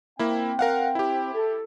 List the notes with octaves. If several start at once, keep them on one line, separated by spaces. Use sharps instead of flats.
A#3 C4 E4 G5
A#4 F5 F#5
E4 G4
A4